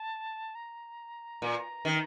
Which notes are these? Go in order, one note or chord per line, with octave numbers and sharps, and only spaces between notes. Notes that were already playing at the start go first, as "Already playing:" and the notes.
Already playing: A5
A#5
A#2
D#3